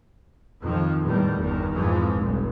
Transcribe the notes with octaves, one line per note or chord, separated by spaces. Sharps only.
F2 D#3 F3
E2 A2 D#3 G3
G1 E2 D#3
F2 G#2 E3 F3 G#3
F1 B1 G2